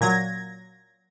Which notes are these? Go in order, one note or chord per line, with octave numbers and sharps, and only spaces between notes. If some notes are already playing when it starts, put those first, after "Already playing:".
A#2 F#3 G#6 A#6